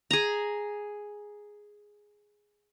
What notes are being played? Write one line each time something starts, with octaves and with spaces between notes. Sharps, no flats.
G#4 A#5